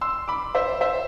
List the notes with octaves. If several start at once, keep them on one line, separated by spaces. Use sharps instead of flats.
C6 E6
B5 D6
C5 E5
C5 E5